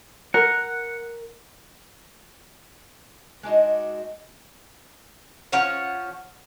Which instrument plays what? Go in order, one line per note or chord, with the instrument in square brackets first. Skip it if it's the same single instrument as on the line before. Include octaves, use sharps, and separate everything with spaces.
[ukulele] A#4 [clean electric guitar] F#5
[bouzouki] G#3 D4 D#4 F#4
F3 C#4 C#5 F#5